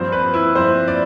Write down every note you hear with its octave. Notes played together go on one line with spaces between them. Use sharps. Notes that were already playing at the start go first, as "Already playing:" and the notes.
Already playing: G2 F3 C4 C5
B4
E4
G2 F3 C4 C5
D5